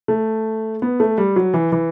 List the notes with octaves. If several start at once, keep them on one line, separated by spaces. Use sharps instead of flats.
A3
B3
A3
G3
F#3
E3
E3